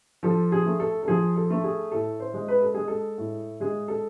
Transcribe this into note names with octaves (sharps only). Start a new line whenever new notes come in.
F3 A4
G#4
A3
A4
A4
F3 G#4
A4
A3
G#4
A2 A4
C5
G#3
B4
A4
G#3 G#4
A4
A2
G#3 G#4
A4